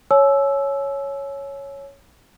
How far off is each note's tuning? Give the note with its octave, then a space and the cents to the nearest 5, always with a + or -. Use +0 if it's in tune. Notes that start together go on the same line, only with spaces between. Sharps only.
C#5 +0 G#5 +45 E6 +0